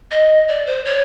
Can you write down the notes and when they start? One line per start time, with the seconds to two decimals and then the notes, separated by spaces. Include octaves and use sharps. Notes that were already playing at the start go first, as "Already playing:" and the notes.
0.11 D#5
0.48 D5
0.67 C5
0.85 C#5